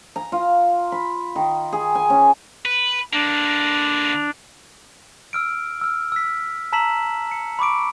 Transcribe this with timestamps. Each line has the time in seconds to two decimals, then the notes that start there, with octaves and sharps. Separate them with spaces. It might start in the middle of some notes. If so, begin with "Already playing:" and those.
0.16 A#5
0.32 F4
0.92 B5
1.36 D#3
1.73 G#4
1.95 G#5
2.10 C#4
2.65 B4
3.13 D3 A#3 D4
5.33 E6 F6 D7
5.81 E6 F6
6.12 E6 B6
6.73 A5 A#5 E6 B6 E7 F#7
7.31 C#7
7.59 B5 C#6 D6 D7